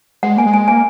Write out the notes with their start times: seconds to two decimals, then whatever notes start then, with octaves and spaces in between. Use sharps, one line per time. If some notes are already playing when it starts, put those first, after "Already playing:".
0.23 G#3 F#5
0.37 A#3 G#5
0.46 G#3
0.54 G#5
0.68 A#3 G#5